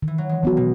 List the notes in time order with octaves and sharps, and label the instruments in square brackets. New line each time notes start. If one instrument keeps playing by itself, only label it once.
[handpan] D#3
[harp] E3
F#3
G#3
[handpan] F#3 B3 F#4
[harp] B2